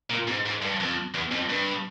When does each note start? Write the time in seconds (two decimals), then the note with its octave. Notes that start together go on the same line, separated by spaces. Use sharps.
0.10 A#2
0.28 G#2
0.46 G#2
0.62 G2
0.80 F2
1.14 E2
1.32 F2
1.50 G2